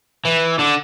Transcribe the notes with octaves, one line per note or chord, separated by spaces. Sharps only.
E3
D3